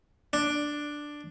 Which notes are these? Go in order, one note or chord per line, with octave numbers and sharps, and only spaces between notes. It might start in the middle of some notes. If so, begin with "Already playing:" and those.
D4